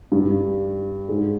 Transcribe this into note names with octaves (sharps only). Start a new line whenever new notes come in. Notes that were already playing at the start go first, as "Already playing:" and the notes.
G2 G3
G#2 G#3